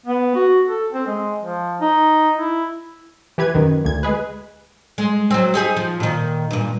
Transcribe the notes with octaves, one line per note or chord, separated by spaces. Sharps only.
B3
F#4
A4
C4
G#3
F3
D#4
E4
E3 G4 B4 G#6
F#2 D#3
D2 G#6
G#3 G#4 B4
G#3
F#3 C4
D#4 G4 G#4
F3
A#2 D#3
G2 A#2